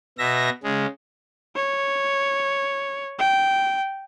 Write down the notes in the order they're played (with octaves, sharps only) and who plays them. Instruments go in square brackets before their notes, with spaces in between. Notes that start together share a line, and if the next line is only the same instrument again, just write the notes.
[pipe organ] B2 E5 A#6
C#3 G#3
[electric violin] C#5
G5